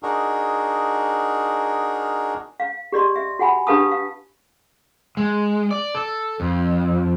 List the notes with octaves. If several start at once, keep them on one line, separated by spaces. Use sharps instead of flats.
D4 D#4 F#4 G#4 A#4
F5
G4 D5 D#5 C6
E5
F#4 F#5 G#5 B5
D4 G4 B4 F5 A5 D#6
F5
G#3
D5
A4
F2